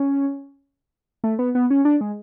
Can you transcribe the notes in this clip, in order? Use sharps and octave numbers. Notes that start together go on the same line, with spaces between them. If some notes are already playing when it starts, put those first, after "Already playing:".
Already playing: C#4
A3
B3
B3
C#4
D4
G#3